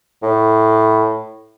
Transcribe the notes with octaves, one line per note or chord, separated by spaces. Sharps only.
A2